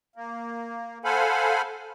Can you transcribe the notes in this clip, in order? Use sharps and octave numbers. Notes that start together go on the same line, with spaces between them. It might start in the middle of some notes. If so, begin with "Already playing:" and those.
A#3
A4 C5 F5 F#5 G#5 B5